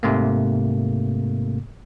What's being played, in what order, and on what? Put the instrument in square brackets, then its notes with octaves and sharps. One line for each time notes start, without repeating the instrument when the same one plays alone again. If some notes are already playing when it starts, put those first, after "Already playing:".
[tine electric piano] G#2 C3 A3 A#3